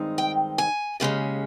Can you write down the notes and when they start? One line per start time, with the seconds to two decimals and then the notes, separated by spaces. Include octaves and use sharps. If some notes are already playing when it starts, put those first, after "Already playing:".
Already playing: G2 D#3 G#3 C4 D#4
0.18 G5
0.58 G#5
1.00 D#2 C#3 G#3 C#4